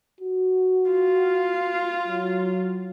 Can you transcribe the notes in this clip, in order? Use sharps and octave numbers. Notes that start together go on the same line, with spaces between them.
F#4
F4
F#3